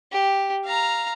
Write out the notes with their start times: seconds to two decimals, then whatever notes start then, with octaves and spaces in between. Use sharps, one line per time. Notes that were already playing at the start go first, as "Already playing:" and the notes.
0.13 G4
0.65 F5 A#5